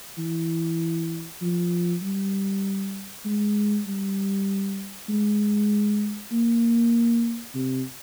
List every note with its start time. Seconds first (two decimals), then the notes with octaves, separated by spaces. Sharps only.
0.18 E3
1.42 F3
2.03 G3
3.25 G#3
3.87 G3
5.09 G#3
6.32 A#3
7.55 C3